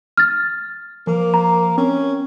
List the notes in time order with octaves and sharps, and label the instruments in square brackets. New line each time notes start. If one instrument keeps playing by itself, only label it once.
[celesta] F6 A6
[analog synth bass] F3 [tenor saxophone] A#3
[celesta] A#5
[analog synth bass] C4 [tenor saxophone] C#4